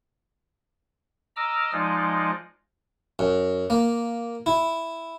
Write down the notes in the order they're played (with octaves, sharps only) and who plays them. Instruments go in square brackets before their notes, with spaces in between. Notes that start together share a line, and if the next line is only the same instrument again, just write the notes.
[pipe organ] D#5 A#5 D6 E6 F6
F3 G#3 D#4 F4 D5 D#5
[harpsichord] F#2
A#3
E4